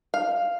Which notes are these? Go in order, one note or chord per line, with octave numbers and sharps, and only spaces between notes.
F5